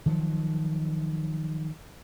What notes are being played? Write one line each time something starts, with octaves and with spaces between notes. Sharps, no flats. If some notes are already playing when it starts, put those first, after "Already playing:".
D#3 F3 F#3